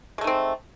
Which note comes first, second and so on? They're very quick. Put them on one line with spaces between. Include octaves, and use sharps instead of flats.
G#3 A3 D#4 C4